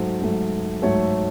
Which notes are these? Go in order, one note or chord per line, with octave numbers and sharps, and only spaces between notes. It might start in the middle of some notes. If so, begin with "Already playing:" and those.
Already playing: G#2 F#3 A3 C5
G#2 F#3 A3
G#2 F#3 A3 A4 C#5